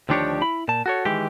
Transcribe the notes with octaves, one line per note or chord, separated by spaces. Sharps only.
D2 D#3 F3 D4 G4 C#5
E4 B5
A#2 A5
F#4 A4 C#5
D#3 E3 G#3 G4